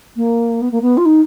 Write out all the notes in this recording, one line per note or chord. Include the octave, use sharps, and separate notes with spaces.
A#3
B3
A#3
B3
F4
D#4